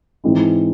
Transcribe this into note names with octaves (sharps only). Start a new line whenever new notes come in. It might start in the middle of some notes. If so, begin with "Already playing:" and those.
G#2 E3 G#3 C4 E4